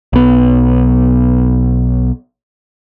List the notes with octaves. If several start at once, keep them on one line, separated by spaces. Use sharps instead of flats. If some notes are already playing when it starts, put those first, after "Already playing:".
B1 B3